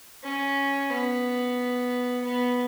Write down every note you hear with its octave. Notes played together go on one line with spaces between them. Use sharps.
C#4
B3
B3